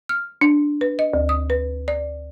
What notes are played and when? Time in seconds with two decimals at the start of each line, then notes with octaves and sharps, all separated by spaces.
0.09 F6
0.41 D4
0.81 B4
0.99 D#5
1.14 D2
1.29 D#6
1.50 B4
1.88 D5